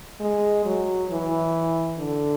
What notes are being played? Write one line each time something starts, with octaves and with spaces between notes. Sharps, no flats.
G#3
F#3
E3
D3